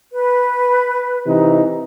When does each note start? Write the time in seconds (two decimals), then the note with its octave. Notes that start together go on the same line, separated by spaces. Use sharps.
0.13 B4
1.26 C3 E3 D#4